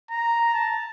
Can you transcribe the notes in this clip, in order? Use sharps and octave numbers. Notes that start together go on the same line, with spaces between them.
A#5
A5